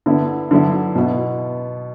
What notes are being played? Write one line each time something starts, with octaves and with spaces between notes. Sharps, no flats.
D3 B3 E4
D3 F#3 B3 E4
B2 B3 E4